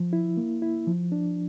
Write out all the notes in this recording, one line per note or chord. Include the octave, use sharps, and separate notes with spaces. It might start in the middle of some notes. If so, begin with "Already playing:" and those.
Already playing: F3
E4
A#3
E4
F3
D4